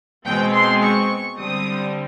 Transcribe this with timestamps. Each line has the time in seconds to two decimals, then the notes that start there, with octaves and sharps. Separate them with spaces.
0.25 B2 G#3 C4 G5
0.53 C6
0.81 C#6
1.38 D3 G3 C4 D#6